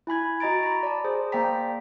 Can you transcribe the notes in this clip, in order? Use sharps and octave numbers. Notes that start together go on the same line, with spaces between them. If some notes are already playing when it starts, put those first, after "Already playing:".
E4 G#5 B5 G#6
F#4 D#5 A#5 A6 D7
A#5 B5
D5 A5
G#4 C5
A#3 C5 D5 G5 A#5 B6